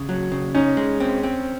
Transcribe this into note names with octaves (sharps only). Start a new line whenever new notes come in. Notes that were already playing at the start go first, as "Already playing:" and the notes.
Already playing: C#3
F#3
C#3
C#4 D#4
G#3
C4
C4